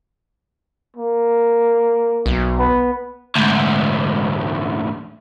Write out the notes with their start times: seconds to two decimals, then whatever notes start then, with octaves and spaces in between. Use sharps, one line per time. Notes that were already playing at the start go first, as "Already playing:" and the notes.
0.96 A#3
2.26 B1
2.59 B3
3.36 D2 G#2